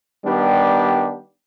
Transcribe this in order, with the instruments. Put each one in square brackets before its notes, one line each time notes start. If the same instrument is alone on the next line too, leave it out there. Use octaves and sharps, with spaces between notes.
[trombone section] D#3 G3 B3 D4 G4